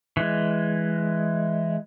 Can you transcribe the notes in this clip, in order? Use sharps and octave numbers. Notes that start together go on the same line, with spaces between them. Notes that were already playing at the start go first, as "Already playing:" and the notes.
E3 G#3